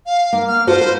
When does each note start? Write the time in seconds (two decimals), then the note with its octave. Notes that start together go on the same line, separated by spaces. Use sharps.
0.06 F5
0.33 A#3
0.48 F6
0.67 F4 F#4 A4 C5
0.81 B4